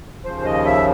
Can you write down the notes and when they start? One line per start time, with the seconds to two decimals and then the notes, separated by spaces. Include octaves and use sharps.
0.25 D#2 C#3 F3 C5
0.45 D#5
0.65 E5